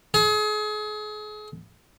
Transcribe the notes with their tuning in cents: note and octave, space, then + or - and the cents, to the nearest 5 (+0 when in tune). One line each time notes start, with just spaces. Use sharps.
G#4 +35